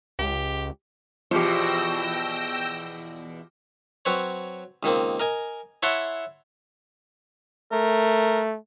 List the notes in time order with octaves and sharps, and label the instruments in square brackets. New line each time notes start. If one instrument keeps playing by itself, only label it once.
[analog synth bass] C#2 [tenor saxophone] G4
[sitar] E2 B2 C5 [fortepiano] F3 G4 [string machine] G5 E6 A#6
[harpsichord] F#3 C4 B4 C#5
C#2 D#3 A#3 C4
A#4 D#5 G#5
E4 C#5 E5 F#5 A5 C6
[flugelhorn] A3 [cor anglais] A#4